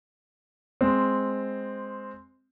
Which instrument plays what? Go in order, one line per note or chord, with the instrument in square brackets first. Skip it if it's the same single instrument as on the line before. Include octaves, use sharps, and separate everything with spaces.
[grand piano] G#3 C4